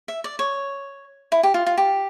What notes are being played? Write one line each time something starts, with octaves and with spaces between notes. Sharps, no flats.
E5
D5
C#5
E4
G4
F4
F4
G4